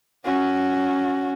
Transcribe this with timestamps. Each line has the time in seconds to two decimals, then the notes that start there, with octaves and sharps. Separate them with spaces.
0.24 C#4 F#4